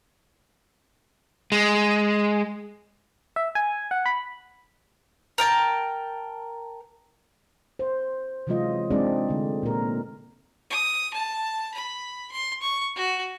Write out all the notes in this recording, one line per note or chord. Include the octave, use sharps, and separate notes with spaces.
G#3
E5
G#5
F#5
B5
A#4 G5 A5
C5
C3 E3 F#3 G#3 F4 D#5
G#3 C4 D4 D#4 G#4 D5
D3 A3
A#2 A#4
D#6
A5
B5
C6
C#6
F#4